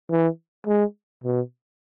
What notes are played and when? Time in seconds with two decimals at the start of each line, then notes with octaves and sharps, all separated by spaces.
0.10 E3
0.67 G#3
1.23 B2